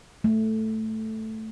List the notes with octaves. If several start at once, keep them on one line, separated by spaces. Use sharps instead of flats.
A3